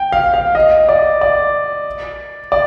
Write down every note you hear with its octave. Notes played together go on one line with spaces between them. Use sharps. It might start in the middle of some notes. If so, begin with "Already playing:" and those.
Already playing: G5
F5
F5
D#5
D5
D5
D5